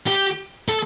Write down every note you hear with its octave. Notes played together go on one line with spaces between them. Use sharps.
G4
A4